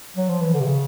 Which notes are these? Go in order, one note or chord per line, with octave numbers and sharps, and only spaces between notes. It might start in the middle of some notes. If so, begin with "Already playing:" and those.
F#3
F3
E3
D3
C3
C#3